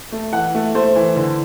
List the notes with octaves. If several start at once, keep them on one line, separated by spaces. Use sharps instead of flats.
A3
E3 F#5
A3
A3 C5
E3
D3